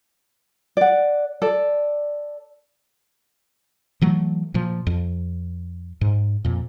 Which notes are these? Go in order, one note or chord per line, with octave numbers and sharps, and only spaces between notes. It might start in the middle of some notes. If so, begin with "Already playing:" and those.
D5 F#5
A4 D5
E3 F#3 A3
A#2 F3
F2
G#2
F2 A#2